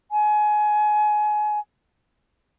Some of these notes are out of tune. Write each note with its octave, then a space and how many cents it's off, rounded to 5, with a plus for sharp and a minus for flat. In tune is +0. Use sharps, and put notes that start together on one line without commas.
G#5 +25